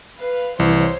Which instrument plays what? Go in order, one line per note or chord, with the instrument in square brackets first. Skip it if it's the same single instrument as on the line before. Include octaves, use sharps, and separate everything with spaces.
[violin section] B4 F5
[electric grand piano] C2 [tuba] E3 [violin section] C5 C#5